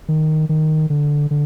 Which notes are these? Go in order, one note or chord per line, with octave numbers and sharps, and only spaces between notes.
D#3
D#3
D3
D3